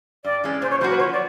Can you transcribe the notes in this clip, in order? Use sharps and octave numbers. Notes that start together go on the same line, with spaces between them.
G2 D5
E3 G#3 C#4
A#2 C5
C#5
F#3 A#3 D4 F#4 C5
B4
F3 C#5
D5